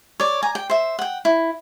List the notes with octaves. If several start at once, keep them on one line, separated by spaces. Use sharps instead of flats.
C#5 D5
G#5 A#5
G5
C5 E5
F#5 G5
E4